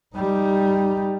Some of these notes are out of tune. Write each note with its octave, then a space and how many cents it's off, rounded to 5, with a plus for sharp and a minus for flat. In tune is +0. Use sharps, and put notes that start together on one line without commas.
G3 +0 D#4 +0